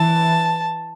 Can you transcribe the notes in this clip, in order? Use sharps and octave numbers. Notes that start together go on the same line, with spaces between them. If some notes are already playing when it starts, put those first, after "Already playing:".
Already playing: E3 A5